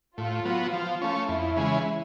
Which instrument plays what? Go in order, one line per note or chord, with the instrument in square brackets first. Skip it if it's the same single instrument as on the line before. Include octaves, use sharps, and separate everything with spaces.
[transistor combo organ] A2 [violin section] F4
[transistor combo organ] F#3 B3
[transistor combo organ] F3 [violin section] F4
[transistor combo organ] A3 C#4
[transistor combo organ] F2 [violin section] E4
[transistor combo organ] C#3 E3 G#3